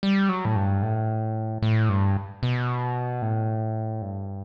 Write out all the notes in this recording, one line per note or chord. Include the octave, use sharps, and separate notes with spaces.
G3
F#3
A2
G2
A2
A2
G2
B2
A2
G2